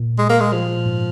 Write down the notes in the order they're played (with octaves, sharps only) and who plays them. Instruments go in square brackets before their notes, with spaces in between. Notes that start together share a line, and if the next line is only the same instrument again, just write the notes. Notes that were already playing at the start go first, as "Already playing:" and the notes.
Already playing: [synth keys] A#2
[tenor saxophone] G#3
A#3
G#3
F3
[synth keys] A#2
G#2